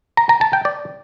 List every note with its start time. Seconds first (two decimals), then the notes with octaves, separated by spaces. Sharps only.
0.17 A#5
0.29 A#5
0.41 A5
0.53 G5
0.65 D5